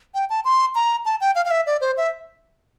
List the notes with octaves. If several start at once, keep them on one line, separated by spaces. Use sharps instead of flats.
G5
A5
C6
A#5
A5
G5
F5
F5
E5
D5
C5
E5